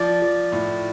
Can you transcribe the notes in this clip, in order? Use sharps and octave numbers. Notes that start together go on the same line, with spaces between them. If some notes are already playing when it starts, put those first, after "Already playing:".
Already playing: F3 D5
F3
A2